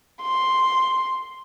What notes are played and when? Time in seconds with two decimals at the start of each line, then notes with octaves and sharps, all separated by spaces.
0.22 C6